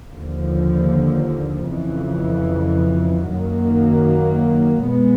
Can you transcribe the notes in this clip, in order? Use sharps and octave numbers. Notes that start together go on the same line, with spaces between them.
D#2 D3 F3
F2 C#3 E3
F#2 D#3 F#3 A#3
B2 G#3 B3